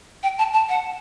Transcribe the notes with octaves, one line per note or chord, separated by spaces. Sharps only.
G5
A5
A5
F#5